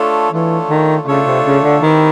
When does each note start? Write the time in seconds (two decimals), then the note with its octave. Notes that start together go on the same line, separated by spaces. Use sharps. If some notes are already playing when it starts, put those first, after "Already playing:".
Already playing: A3 D4 F4 A4 C#5
0.32 E3 A3 D4 F4 A4 C#5
0.70 D#3
1.07 C#3 A3 D4 F4 A4 C#5
1.26 C3
1.45 C#3
1.64 D3
1.82 D#3 C4 E4 G4 B4 E5